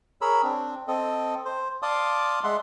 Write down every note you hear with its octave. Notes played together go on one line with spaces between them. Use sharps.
G#4 A#4 C#5 B5 E6
C4 D4
C4 A4 D#5
C5
D5 F5 A5 C6 D6 D#6
G#3 E5 F#5 C6